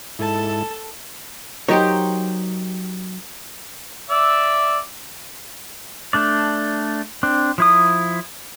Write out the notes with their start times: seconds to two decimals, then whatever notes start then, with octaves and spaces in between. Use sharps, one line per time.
0.19 G#2 E4 A4 A5
1.69 F#3 D#4 G4 A#4 C5 C#5
4.10 D5 E5 E6
6.13 A3 D4 D5
7.23 C4 D4
7.58 F3 E4 D#6